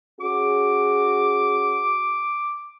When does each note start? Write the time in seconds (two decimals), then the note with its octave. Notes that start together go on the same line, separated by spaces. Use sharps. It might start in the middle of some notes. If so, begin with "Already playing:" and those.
0.20 C#4 F#4 G#4 D6